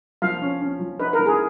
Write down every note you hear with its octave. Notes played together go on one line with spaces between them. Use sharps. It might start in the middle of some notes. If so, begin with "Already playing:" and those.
F3 F5
C#4
C#4
F3
D#4 B4
A#4
E3
G#4